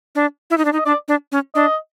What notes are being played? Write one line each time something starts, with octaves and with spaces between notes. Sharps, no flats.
D4
E4
D#4
D4
D#4
D#5
D4 D5
D4
C#4
D4 D#5